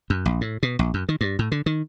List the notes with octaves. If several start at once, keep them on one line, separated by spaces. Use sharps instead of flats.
F#2
A#1
A2
B2
A#1
F#2
D#3
G2
A2
D3
D#3